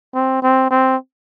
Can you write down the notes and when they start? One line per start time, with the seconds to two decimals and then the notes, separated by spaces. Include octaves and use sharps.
0.15 C4
0.43 C4
0.71 C4